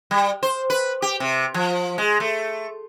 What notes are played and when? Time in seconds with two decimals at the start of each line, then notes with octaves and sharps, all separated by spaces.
0.11 G3
0.43 C5
0.70 B4
1.02 G4
1.20 C3
1.54 F3
1.98 G#3
2.20 A3